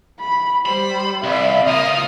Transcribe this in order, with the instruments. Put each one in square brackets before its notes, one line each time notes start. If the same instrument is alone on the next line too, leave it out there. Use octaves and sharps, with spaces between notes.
[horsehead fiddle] B5
[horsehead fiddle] G3 [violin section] C5 [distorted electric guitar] B5
[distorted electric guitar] C2 [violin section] D5 B5 [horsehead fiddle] E5 F5
[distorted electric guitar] C#2 A#3 [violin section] F4 D#6 F6